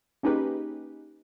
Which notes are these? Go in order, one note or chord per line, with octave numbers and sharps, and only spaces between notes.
A#3 C#4 D#4 G4 G#4 B4